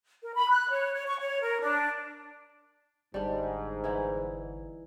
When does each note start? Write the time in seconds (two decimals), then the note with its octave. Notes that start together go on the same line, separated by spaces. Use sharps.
0.23 A#4
0.35 B5
0.50 F#6
0.70 C#5
0.93 C#5
1.07 C#6
1.19 C#5
1.40 A#4
1.61 D4
3.14 G1 G#2 G3 D4
3.84 E3 D#4 E4